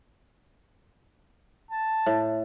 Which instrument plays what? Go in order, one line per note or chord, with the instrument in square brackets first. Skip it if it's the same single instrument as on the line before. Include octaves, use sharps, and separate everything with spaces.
[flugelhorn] A5
[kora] A2